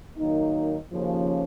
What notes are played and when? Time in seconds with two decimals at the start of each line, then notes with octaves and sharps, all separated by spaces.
0.17 D#3 F#3 A#3 D#4
0.90 D#2 C#3 F3 A#3 C#4